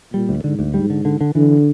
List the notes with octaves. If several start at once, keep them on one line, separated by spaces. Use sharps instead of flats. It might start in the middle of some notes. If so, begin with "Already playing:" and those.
A#2 G3
D2
G#2 D3
D2
G#2 G3
D3
D3
D3
D3 E3